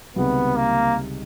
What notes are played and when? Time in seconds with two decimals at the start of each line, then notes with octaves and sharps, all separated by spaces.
0.16 C#2 C3 D#3 G3 B3
0.56 A#3